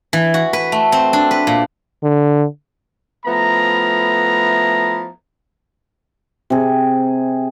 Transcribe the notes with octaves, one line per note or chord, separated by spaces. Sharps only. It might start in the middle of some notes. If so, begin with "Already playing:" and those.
E3
F#4
B4
A3
C4
D4
B4
A#2
D3
F3 A3 B3 E4 A#5
C3 G#4